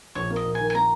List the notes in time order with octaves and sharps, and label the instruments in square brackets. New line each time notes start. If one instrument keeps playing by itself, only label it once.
[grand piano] A#1 [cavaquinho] C#5
[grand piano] A#3
[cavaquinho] D#5
[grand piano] A#1
[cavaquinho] G#5
[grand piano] D#3
[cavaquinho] G#5
[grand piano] A#3 [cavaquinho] A#5